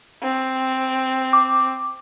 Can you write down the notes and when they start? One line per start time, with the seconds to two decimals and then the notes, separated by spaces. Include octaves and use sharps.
0.23 C4
1.33 D6